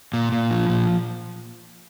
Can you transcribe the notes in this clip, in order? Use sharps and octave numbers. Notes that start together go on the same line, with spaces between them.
A#2
A#2
F3
A#2